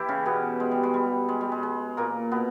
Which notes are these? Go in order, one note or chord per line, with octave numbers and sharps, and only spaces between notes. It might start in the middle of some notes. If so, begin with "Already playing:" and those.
Already playing: E3 E4 G4
C#3 C#4
B2 B3
G#3
G3
G#3
G3
G#3
G3
G#3
G#3
A#2 A#3
B2 B3